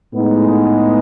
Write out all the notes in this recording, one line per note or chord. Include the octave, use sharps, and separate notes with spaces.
A2 G#3 B3 D#4